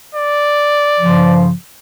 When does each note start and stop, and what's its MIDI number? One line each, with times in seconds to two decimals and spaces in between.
0.15 1.37 74
1.00 1.51 43
1.00 1.51 49
1.00 1.51 53